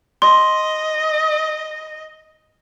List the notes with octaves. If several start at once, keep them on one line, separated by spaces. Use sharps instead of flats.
D#5 C6